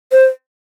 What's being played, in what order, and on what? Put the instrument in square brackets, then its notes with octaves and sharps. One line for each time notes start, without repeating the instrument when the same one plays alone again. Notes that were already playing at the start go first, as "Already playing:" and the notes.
[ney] C5